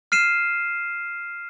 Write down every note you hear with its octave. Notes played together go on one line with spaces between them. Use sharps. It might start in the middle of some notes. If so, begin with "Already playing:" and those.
F6 C7 D#7 E7